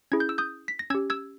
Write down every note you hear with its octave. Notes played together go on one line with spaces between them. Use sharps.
C#4 E4 G#4 G#6
G6
E6
D#6 G6
B6
A#6
C#4 G4 E6 G#6
E6 G#6